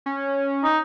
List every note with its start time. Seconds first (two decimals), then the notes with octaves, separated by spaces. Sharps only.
0.06 C#4
0.64 D#4